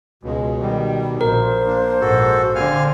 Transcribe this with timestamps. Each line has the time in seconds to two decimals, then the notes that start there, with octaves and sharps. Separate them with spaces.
0.23 C#2 B2 G#3
0.60 D#3 G3
1.21 A#1 A#4 C5
1.67 A#3 D4
2.01 A#1 G#2 F#4 A4
2.55 D3 C4 F5 G#5 F6